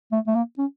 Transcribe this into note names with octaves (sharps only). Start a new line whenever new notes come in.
A3
A3
A#3
C#4